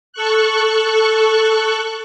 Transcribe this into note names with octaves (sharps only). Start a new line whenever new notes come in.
A4 C#6 F#6